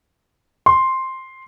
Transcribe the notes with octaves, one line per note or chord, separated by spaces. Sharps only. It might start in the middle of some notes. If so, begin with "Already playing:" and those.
C6